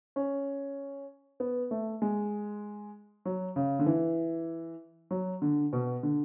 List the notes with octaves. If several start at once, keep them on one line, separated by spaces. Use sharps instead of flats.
C#4
B3
A3
G#3
F#3
C#3
D3
E3
F#3
D3
B2
D3